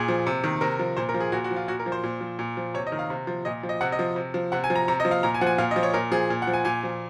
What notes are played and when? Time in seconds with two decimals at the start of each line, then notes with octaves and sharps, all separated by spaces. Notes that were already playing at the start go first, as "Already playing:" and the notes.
Already playing: A#2 G#4
0.08 F3
0.27 C3
0.44 D#3
0.61 C3 A#4
0.79 F3
0.97 A#2 C5
1.09 A#4
1.14 F3
1.20 G#4
1.32 A#2 F#4
1.44 F#4
1.51 F3
1.56 F4
1.68 A#2 F#4
1.79 A#4
1.86 F3
1.92 C5
2.03 A#2
2.21 F3
2.39 A#2
2.57 F3
2.74 C3 C#5
2.87 D#5
2.92 D#3
2.99 F5
3.10 C3
3.27 F3
3.45 A#2 D#5
3.63 F3
3.69 D#5
3.81 C3 F#5
3.92 D#5
3.99 F3
4.16 C3
4.34 F3
4.52 C3 F#5
4.64 G#5
4.70 F3
4.76 A#5
4.88 C3 A#5
5.00 D#5
5.05 F3
5.11 F5
5.23 A#2 A#5
5.34 G#5
5.41 F3 F#5
5.47 G#5
5.58 A#2 F5
5.71 D#5
5.76 F3
5.83 C#5
5.94 A#2 A#4
6.12 F3 G#4
6.30 A#2
6.42 F#5
6.47 F3
6.54 G#5
6.65 A#2 G#5
6.83 F3